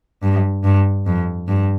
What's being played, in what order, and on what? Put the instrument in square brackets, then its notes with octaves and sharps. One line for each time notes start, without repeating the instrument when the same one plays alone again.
[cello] G2
G2
F2
G2